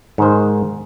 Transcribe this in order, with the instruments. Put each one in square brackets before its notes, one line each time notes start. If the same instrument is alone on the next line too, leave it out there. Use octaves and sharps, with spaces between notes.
[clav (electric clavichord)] G#2 D#3 C5